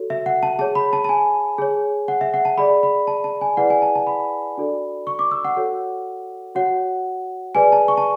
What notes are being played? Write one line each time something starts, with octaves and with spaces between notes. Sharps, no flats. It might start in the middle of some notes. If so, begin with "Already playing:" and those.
Already playing: F#4 A4 C#5
E5
F#5
A5
G#4 C#5 A5
B5
A5
A5
G#5
G#4 C#5
F#5
E5
F#5
A5
G#4 D5 B5
B5
A5
A5
G#5
E4 G#4 B4 D5 F#5
G#5
A5
A5
B5
D4 F#4 A4 D5
C#6
D6
E6
F#5
F#4 A4 C#5
F#4 C#5 F#5
G#4 B4 D5 G#5
A5
C#6
A5